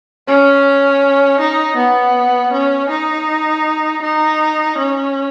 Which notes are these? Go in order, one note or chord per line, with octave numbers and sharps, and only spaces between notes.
C#4
D#4
B3
C#4
D#4
D#4
C#4